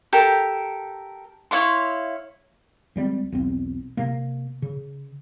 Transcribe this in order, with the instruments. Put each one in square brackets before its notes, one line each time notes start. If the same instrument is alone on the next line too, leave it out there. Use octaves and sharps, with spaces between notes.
[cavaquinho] G4 A4 A#4
E4 C#5 F5 C6
[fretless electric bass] C#2 G3 G#3 C4
B1 E2 C4
C3 A#3
C#3